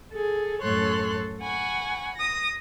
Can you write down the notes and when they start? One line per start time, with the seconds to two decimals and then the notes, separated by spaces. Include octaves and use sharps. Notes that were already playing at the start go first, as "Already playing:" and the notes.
0.12 G#4 A4
0.62 F#2 A2 A4 C#5 C6 F#6
1.40 F#5 G#5 B5 C#6
2.15 D#6 A#6